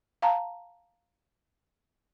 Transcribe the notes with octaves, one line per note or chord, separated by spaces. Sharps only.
F5 A5 A#5